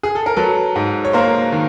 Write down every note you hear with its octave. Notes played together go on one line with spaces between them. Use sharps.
G#4
A4
A#4
F#3 A4 B4
G#2
C#5
A#3 A#4 C5
D#3